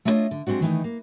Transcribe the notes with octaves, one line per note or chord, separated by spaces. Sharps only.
A3 D4 E4 F4 C#5 D#5
D3
G#3 A#3 C4 D4 F#4
D#3 E3 A3 D#4
A#3